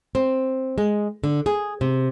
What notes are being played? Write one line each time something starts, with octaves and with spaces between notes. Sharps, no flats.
C4
G#3
D3
G#4
C3